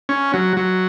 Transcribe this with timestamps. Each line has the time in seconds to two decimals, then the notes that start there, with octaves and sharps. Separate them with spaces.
0.09 C#4
0.34 F#3
0.57 F#3